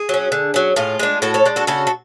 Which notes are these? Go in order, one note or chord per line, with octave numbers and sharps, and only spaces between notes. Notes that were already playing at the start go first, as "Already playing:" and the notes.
Already playing: G#4
F#3 C#4
D3
F#3 C#4
A2 F4 G#4
G#3 D4
A2 F#4 A4
A4 C#5
G#3 D4
F#4 A4
C#3 F#4 A4
A4